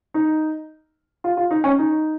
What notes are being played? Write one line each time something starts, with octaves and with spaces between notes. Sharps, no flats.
D#4
F4
F4
D#4
C#4
D#4